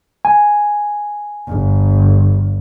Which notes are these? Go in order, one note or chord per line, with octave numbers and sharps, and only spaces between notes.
G#5
G1